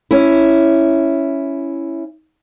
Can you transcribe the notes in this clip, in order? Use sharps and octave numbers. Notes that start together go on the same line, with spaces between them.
C#4 E4